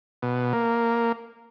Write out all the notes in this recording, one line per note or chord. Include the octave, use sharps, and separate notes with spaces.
B2
A#3